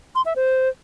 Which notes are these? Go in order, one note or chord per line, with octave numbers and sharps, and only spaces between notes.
C6
E5
C5